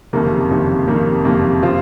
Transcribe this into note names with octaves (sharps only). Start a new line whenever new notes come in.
F#1 F2 C3 D#3 A#3
F#1 F2 C3 D#3 A#3
F#1 F2 C3 D#3 A#3
F#1 F2 C3 D#3 A#3
C3 F3 C4 F4